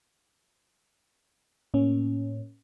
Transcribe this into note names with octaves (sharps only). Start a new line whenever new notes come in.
A2 A#3 C#4